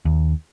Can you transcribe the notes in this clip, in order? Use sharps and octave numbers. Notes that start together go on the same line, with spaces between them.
D#2